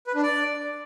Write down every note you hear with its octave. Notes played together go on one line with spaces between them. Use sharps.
B4
D4
D5